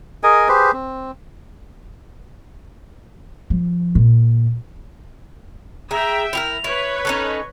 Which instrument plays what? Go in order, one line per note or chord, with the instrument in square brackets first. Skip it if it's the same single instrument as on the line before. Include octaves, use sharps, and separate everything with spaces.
[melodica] G#4 A#4 D#5 G#5
G4 G#4 B4 C5
C4
[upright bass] F3
A#2
[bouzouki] G#4 [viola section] E5 G5 [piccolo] A#5
[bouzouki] E4 G4 A#4 [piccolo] F7
[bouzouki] E4 [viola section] B4 C#5
[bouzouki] C#4 D#4 A4 [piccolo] C#6